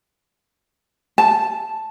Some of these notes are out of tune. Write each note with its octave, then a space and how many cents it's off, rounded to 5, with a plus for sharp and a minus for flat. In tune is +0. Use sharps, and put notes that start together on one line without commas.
A5 -5